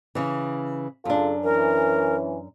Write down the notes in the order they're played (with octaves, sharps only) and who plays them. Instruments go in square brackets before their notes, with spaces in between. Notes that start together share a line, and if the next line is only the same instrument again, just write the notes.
[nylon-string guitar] C#3 E3
[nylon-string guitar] F#2 D4 [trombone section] C#3 F4 A4
[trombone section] E3 C#4 [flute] A#4